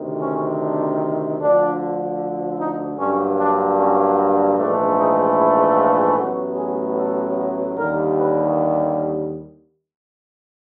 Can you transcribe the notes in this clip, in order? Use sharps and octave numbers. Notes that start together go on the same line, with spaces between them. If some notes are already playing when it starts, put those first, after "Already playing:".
Already playing: D2 C3 D#3
C#4
D4
D2 D3 F3 D4
D#4
G2 D3 F#3 A#3 C#4
D4
C#4
A#1 G#2 E3 A3 D4
D#4
E4
F4
A1 A2 F#3 B3 F#4
G#4
A4
D#2 D3 G3 A#4
B4